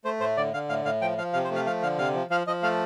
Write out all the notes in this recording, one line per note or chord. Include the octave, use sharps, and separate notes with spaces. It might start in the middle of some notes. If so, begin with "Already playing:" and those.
A3 C5
A2 C5
D3 D5
D3 F5
A2 F5
A2 F5
F3 G5
F3 F5
C3 F5
C5
A3 F5
F3 F5
D3 F5
C3 F5
F3
F3 F5
F3 D#5
A3 F5